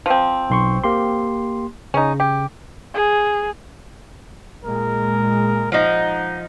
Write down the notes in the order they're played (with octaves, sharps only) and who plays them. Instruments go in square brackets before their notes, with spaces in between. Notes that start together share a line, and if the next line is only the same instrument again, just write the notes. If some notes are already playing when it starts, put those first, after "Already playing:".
[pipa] F3 C4
[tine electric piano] B1 C6 C#6
A#3 G4 C6
[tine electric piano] C#3 [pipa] C#4 D#4
[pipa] G4
[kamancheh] G#4
[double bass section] A#2 G#3 [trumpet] A#4
[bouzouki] F3 D#4 [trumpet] F#5